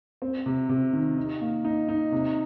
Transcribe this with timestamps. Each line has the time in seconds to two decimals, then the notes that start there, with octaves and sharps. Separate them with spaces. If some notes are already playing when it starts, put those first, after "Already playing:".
0.22 C4
0.46 C3
0.69 C3
0.93 D#3
1.17 D#4
1.41 A#3
1.65 D#4
1.88 D#4
2.12 C3